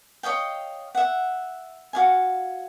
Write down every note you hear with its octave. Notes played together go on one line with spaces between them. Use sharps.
C#5 D#5 F5 G5
E5 F#5
F#4 F5 G#5